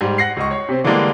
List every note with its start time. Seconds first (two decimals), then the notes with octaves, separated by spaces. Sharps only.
0.01 G#2 G3
0.18 F#5 A#6 C7
0.37 C#2 D#5 C#6
0.51 C#5
0.69 C3 C4
0.84 D3 E3 G3 G#3 A#3 D4